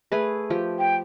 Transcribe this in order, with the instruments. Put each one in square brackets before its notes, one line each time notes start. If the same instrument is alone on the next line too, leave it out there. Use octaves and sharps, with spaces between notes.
[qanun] A3 G#4 B4
F3 G4
[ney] G5